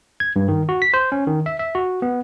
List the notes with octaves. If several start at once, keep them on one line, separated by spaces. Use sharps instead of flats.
G#6
G2
D#3
F#4
B6
C5
C#4
D#3
E5
E5
F#4
B3